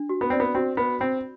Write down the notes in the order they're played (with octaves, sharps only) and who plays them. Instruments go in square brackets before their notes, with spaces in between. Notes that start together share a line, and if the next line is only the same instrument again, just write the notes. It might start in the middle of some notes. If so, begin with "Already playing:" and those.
Already playing: [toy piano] D4
F#4
[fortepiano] B3
[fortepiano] C4 [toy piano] D5
[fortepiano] B3
[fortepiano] C4 [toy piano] F#4
[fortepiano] B3 [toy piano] C5
[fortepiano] C4 [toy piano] B5